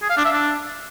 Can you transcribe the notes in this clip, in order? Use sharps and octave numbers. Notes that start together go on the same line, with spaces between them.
G#4
F5
D4
E5
D4